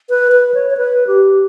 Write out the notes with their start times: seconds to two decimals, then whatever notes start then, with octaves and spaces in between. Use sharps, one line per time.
0.10 B4
0.32 B4
0.54 C#5
0.70 C#5
0.77 B4
1.07 G4